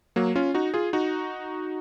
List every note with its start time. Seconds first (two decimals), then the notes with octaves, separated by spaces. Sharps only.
0.16 F#3 A#3
0.35 C#4 F4
0.54 D#4 F#4
0.74 F4 G#4
0.93 D#4 F#4